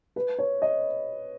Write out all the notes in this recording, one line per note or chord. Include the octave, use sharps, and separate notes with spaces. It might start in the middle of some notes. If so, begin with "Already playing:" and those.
B4
C#5
D#5